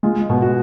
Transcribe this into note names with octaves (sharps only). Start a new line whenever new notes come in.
G#3 F4
B2
F#4